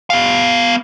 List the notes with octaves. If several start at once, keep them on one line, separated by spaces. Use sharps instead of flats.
B3 F5